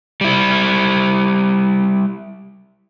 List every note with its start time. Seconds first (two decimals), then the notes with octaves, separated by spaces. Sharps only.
0.21 G3 E4